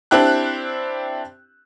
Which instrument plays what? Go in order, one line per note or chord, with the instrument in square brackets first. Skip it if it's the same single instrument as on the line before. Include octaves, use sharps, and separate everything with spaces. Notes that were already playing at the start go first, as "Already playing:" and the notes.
[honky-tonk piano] C4 D4 E4 G4 F#6